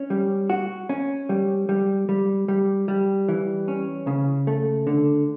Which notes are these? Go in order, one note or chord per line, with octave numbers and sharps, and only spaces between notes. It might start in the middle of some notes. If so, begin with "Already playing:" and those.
Already playing: C#4
G3
F#4
C#4
G3
G3
G3
G3
G3
E3
C#4
C#3
A3
D3